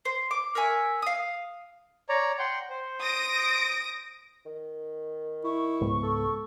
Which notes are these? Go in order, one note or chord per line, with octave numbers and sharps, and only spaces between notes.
C5
D6
A#4 C#5 E5 G#5
F5 D#6
C#5 D5 A#5
F#5 G5 C6
C5
D#6 A#6 D7
D#3
E4 C#6
C#2 G#2 B3
A4